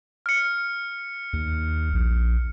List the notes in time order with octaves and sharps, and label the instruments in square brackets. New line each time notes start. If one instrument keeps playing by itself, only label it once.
[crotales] F6 C#7
[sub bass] D#2
A#1